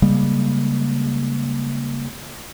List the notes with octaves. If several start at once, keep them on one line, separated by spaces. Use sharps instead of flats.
C#3 G3 G#3 A#3